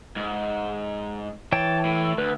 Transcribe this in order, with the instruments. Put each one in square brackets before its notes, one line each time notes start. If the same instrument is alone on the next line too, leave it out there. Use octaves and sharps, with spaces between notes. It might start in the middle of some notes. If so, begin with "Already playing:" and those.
[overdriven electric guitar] G#2
[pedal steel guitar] E3 C#5 G5 [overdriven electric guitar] A5
[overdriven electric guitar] A2
[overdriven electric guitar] D2 [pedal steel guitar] B4